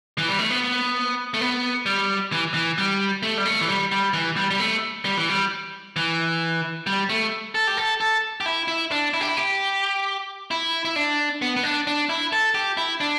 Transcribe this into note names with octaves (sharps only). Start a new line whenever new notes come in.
E3
G3
A3
B3
A3
B3
G3
E3
E3
G3
A3
G3
A3
E3
G3
G3
E3
G3
G3
A3
G3
E3
G3
E3
G3
A3
A4
G4
A4
A4
G4
E4
E4
D4
E4
G4
E4
G4
E4
E4
D4
B3
B3
D4
D4
E4
A4
G4
E4
D4